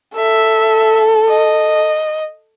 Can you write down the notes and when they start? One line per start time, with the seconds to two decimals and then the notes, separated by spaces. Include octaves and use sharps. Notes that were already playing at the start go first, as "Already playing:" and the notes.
0.16 A4 E5
1.29 D#5